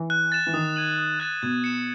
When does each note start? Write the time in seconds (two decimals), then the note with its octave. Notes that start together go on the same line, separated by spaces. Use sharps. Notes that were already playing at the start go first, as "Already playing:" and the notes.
Already playing: E3
0.10 F#6
0.32 A6 E7
0.46 E3
0.53 D#3 D#6
0.76 G#6 D#7 F#7
0.98 D#6
1.20 F#6 A6 E7
1.42 B2 G#6
1.64 C#7 E7